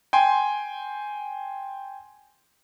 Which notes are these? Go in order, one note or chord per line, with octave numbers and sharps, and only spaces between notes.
G5 G#5 C6